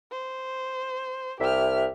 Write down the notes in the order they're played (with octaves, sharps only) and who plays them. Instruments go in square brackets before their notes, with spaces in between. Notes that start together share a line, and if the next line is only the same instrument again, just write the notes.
[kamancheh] C5
[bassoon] C2 [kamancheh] G4 F6 [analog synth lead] E5